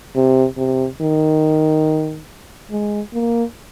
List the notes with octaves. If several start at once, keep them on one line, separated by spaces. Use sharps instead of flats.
C3
C3
D#3
G#3
A#3